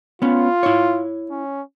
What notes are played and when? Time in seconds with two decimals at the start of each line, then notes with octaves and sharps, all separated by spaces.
0.22 B3 C#4 F4
0.63 E4 C#5
1.30 C#4